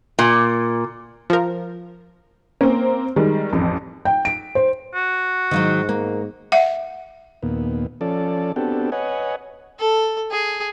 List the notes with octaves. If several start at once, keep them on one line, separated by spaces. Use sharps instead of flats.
A#2
F3 A#4
A#3 C4 C#4
D#3 G3 G#3
A1 F2
G5
D7
C5
F#4
G#2 D#3 F3 F#3
A#3
E5 F#5
D#2 A#2 B3
F3 C#4 A4 D5
B3 C4 D4 F#4 G4 A4
B4 C#5 D#5 F#5 G#5
A4
G#4